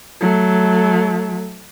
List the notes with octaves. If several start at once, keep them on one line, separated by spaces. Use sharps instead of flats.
F#3 A3